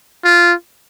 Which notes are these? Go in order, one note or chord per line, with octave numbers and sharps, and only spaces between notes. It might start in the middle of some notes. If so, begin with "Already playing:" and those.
F4